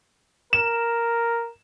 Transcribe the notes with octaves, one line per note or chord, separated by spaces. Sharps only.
A#4 E7